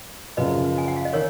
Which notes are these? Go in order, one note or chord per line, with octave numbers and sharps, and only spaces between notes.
F#2 C#3 F3 B4 D#5
G#5
F#5
F5
D#5
D#3 A#4 C#5